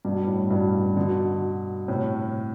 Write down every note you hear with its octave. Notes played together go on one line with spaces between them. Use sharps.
G2 B2
A2
G2 B2
B2 D3
A2 C3